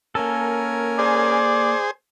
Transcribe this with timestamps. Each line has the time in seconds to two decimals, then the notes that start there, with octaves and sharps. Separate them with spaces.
0.15 A#3 C#4 A4 A#4 G#5
0.99 G#4 C5 D5